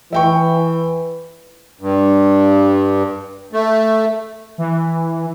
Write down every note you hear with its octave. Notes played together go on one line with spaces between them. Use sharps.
E3 E5 G5 C#6
G2
A3
E3